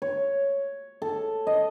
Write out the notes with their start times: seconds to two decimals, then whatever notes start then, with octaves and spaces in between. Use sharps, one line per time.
0.02 C#5
1.02 A4
1.47 D#5